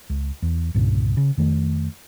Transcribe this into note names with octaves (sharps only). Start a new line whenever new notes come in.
C#2
E2
C2 G2 A#2 C#3
C#3
F2 D#3 A3